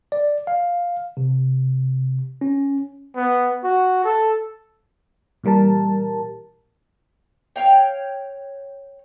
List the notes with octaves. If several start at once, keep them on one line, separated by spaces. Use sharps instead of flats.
D5
F5
C3
C#4
B3
F#4
A4
A#2 E3 G3 A#4 A5
C#5 F5 G5